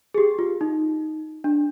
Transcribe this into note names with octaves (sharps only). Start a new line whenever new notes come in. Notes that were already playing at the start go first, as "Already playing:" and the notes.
G#4
G4
F4
D#4
D4